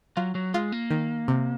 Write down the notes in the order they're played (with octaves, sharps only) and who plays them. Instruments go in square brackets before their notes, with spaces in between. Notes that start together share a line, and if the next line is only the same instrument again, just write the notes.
[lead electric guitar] F#3 [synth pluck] F4
[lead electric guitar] F#3
[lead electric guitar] G#3 [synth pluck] F4
[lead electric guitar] A#3
[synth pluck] D#3
C3